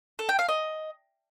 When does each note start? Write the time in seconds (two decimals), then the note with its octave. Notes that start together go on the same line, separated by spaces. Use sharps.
0.19 A4
0.29 G5
0.39 F5
0.49 D#5